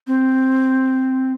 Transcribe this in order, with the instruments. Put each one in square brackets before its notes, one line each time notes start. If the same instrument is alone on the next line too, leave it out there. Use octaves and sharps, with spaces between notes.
[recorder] C4